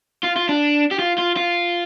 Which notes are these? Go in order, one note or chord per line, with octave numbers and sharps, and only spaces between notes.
F4
F4
D4
G4
F4
F4
F4